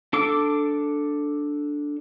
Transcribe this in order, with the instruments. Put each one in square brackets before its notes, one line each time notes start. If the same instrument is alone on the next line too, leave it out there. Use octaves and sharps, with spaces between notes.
[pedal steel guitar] D4 A4 D6